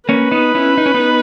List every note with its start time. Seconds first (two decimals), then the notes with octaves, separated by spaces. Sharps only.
0.09 A#3 C#4 B4
0.31 B3 D#4
0.55 C#4 E4
0.78 D#4
0.86 C#4
0.94 B3 D#4